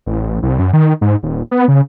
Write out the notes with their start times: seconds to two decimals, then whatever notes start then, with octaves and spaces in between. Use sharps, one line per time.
0.06 A1
0.42 C2
0.59 F#2
0.73 D#3
1.01 G#2
1.23 D#1
1.51 B3
1.68 C#3